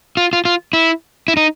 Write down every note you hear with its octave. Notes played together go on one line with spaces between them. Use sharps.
F4
F4
F4
E4
E4
D#4